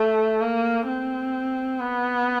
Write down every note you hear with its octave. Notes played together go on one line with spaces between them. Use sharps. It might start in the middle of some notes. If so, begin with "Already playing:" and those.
Already playing: A3
A#3
C4
B3